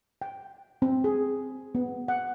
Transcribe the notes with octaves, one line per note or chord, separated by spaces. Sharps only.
G5
C4
G#4
B3
F#5